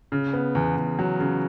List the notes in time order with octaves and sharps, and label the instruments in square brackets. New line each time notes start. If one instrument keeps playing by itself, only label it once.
[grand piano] C#3
B3
E2
E2
F#3
C#3